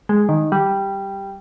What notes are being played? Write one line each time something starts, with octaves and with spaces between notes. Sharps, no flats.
G#3
D#3
G3